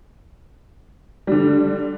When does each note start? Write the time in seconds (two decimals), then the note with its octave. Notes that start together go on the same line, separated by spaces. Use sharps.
1.27 D3 G3